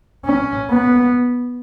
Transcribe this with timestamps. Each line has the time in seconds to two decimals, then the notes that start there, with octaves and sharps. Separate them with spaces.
0.25 C#4
0.71 B3